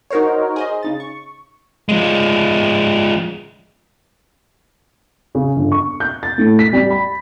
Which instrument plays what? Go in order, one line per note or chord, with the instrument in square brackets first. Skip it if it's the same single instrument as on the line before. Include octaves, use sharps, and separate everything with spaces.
[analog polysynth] D#4 F#4 A#4 C5 C#5
G#4 C5 D#5
C#3 D#4 A6
C#6
[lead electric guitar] F3 G#3
[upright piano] C#3
G1
C#6
G6
A6
A2
B6
G3
B5